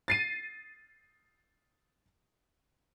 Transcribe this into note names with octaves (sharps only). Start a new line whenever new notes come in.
A6 C7 D#7